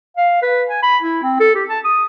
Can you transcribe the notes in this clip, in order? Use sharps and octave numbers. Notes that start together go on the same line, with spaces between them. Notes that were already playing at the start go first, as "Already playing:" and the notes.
F5
B4
G#5
B5
E4
C4
A4
G4
A5
D#6